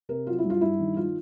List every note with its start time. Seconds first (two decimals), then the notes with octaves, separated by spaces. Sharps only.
0.09 C3 A#4
0.27 F#3 F4
0.38 E4
0.44 G2
0.50 F4
0.61 G2 E4
0.80 D#3
0.97 D#3 F4